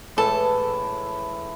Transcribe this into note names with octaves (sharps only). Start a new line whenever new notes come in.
A2 E3 G#3 A4